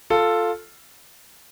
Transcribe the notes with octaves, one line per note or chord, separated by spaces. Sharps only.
F4 A4